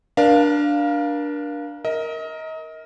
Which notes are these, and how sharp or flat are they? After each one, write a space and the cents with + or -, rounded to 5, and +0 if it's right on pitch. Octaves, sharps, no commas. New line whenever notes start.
D4 +0 A#4 +35 F5 +0
A#4 +0 D#5 +35